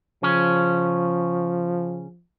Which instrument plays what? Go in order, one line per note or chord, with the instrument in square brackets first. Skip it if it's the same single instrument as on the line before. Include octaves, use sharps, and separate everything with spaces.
[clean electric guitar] C#3 C#4 [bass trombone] F3